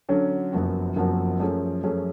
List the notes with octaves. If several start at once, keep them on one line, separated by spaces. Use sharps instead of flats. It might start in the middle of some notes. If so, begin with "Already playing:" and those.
D3 F#3 C#4
F#1 F#2 F3 B3 F#4
F#1 F#2 F3 B3 F#4
F#2 F3 A3 C#4 G#4
F#2 F3 A3 C#4 G#4